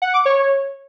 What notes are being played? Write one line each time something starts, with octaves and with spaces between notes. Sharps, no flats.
F#5
D6
C#5